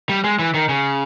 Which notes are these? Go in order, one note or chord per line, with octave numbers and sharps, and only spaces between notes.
G3
G#3
E3
D#3
C#3